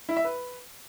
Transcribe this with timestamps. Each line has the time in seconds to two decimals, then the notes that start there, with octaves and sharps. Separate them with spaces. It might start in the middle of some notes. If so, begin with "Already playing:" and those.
0.09 E4
0.17 E5
0.25 B4